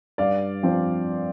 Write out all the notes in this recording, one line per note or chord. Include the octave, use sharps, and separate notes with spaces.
G2 D5 F5
F3 C4